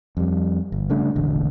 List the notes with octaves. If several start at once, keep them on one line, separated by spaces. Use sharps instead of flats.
F2 G3
G1
C#3 G3 A3 D4
E1 A1 D3